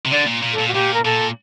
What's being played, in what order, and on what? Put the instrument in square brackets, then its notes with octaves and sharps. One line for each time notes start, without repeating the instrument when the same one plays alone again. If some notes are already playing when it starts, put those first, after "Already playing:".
[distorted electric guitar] C3
[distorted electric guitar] D3 [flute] D5
[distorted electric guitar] A#2
A#2
[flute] A4
[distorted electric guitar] A#2
[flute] F#4
[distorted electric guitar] A#2 [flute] G4
[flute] A#4
[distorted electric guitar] A#2 [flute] A4